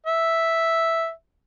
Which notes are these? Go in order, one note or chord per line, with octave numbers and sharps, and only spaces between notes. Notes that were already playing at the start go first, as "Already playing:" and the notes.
E5